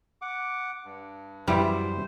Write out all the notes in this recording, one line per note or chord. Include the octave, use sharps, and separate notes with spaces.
F#5 D6
G2
F#2 E3 G3 E4 C5